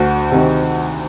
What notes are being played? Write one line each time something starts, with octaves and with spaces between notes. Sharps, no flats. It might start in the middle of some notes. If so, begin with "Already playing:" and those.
Already playing: D2 F#4
C3 D#3